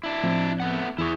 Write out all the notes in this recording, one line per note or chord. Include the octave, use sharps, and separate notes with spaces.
D4 E4
A2 F3 C4
A3 B3 F#5
E2 E4 G#4 C#6